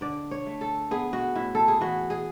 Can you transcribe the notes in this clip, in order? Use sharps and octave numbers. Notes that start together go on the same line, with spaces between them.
D3 D5
C#5
A3
A4
B3 G#4
F#4
A2 E4
A4
G#4
E3 F#4
G#4